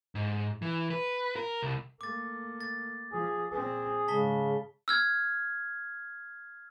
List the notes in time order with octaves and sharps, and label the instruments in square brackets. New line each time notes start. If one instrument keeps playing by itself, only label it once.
[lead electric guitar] G#2
E3
B4
A#4
C2
[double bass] A3 A#3 [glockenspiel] D6 A6
[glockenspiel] A6
[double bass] F3 [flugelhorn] G#4
[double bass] A#2 C4 [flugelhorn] G#4
[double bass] G#2 G#3 [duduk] C#3 [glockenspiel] A5 B6 G7
[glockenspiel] E6 F6 G#6